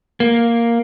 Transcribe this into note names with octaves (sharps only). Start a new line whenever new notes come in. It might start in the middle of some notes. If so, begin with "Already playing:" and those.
A#3